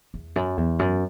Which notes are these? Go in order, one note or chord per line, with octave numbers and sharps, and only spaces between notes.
E2
F#2
E2
F#2